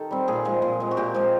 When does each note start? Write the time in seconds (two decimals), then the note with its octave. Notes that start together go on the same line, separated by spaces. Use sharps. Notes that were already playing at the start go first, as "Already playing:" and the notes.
Already playing: D#3 G4 A4
0.11 G3 C4
0.28 A#2 G#4
0.45 F3 G#3
0.62 A#2
0.80 F3 G#3
0.91 F#4
0.97 A#2 G4
1.14 F3 G#3